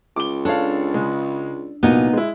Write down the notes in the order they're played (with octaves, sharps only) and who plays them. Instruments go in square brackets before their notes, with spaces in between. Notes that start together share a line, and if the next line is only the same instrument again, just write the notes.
[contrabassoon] C#2 [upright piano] D6 G7
[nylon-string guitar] D4 [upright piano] A4 C#5 F5
[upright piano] C#3 G#3
[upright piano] C2 A#2 F#3 [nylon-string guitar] B3 D#4
[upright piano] G#3 E4